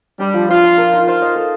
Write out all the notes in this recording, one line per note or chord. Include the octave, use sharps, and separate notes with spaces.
G3 D4
F3
F4 C5
F5
A#4
D#4
F4 C5
D#5
A4